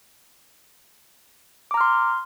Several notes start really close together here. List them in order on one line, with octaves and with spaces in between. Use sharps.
D6 A#5 F6 C6